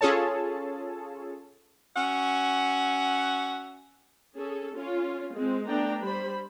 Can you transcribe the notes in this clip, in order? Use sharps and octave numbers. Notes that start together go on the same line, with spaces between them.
C#4 F4 G#4 A4 C#5 A5
C#4 F#4 E5 F#5
C#4 G#4 A4
C#4 F4
G#3 C4
A3 B3 D4 D5 G5 A#5
G3 C5 B5